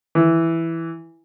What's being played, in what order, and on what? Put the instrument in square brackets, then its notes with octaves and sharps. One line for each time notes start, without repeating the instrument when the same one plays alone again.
[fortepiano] E3